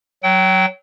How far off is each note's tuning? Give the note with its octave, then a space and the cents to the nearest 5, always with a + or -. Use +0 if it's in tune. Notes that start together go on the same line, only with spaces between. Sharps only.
F#3 +10 G5 -30